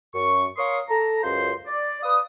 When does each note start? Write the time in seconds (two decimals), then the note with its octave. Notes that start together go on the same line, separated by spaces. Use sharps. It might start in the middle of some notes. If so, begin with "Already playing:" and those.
0.14 F#2 C#6
0.57 A#4 C#5 F5 C6 C#6 D#6
0.89 A4 A#5
1.23 C#2 F#2 F4 C5 C6
1.66 D5
2.03 B4 D5 F5 D#6